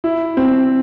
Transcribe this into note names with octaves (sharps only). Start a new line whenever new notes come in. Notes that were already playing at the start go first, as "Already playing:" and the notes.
E4
C4